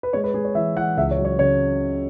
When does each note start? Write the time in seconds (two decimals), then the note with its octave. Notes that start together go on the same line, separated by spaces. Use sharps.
0.03 B4
0.13 G#3 C#5
0.24 B4
0.34 G#3 G#4
0.45 C#5
0.55 E3 E5
0.76 E3 F#5
0.97 C#2 E5
1.11 C#5
1.18 F#3
1.25 C#5
1.39 C#3 C#5